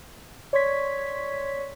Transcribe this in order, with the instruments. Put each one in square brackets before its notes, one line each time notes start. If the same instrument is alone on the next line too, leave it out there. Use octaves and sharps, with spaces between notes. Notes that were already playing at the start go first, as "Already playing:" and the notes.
[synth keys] C#5 D5 C6 C#6 G#6 B6